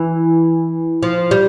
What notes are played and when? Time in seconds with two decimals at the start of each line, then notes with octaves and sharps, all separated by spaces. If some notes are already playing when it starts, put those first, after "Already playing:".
Already playing: E3
1.03 F3
1.31 G3